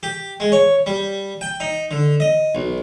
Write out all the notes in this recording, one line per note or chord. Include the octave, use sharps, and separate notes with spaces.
G4
G#3
C#5
G3
G5
D#4
D3
D#5
B1